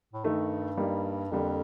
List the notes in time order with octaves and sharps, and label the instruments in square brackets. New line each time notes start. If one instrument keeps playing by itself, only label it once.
[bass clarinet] A2
[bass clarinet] G2 [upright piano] D#3 A3 D#4
[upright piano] G3 A#3 D#4
[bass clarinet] F2 [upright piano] D3 G3 A#3